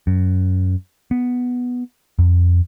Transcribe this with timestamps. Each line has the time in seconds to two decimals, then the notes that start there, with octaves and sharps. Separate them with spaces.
0.07 F#2
1.11 B3
2.19 F2